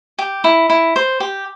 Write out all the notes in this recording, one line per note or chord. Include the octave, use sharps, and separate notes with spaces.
G4
E4
E4
C5
G4